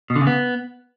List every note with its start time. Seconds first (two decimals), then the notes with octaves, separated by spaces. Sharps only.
0.10 B2
0.16 D3
0.21 C#3
0.27 B3